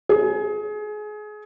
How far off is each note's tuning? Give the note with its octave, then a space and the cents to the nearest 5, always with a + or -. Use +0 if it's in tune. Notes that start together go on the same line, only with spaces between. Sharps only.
G#4 +25